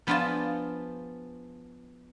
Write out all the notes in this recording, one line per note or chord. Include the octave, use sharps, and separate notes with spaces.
F3 B3 D4 F4 G#4 A5